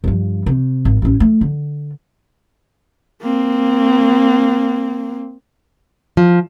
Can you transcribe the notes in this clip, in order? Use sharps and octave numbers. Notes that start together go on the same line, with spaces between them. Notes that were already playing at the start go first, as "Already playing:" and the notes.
G2 F3
C3
G#1
A1 C#4
A3
D3
A#3 C4
F3